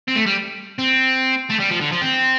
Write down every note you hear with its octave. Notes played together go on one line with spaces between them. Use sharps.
C4
A3
G3
C4
A3
G3
F3
D3
F3
C4